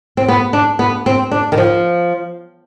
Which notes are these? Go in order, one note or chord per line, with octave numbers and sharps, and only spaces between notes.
C4
B3
D4
B3
C4
D4
D#3
F3